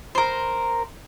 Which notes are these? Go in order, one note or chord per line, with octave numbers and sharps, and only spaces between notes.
A#4 C5